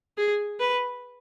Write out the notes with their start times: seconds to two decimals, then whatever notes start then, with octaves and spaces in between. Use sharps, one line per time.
0.17 G#4
0.60 B4